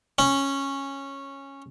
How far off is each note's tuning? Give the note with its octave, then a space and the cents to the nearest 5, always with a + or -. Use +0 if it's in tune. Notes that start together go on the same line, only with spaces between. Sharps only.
C#4 -10